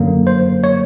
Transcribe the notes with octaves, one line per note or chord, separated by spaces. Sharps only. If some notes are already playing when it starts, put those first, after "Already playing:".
Already playing: F#2 D3 F#3 A#3
C5
C#5